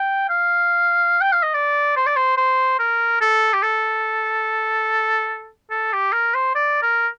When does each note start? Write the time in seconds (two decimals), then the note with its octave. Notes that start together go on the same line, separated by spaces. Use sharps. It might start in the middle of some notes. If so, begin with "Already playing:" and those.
Already playing: G5
0.30 F5
1.21 G5
1.32 F5
1.43 D#5
1.54 D5
1.97 C5
2.06 D5
2.16 C5
2.37 C5
2.79 A#4
3.21 A4
3.53 G4
3.63 A4
5.71 A4
5.93 G4
6.13 A#4
6.34 C5
6.55 D5
6.83 A#4